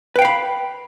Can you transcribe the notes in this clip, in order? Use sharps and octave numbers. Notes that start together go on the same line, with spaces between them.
B4 F5 G5 B5